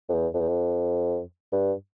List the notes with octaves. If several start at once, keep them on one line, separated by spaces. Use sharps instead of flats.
F2
E2
F2
E2
F2
G2